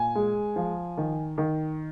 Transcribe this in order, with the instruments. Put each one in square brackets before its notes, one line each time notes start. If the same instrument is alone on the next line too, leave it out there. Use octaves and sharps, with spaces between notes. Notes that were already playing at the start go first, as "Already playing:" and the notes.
Already playing: [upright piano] A#2 G#5
G#3
F3
D#3
D#3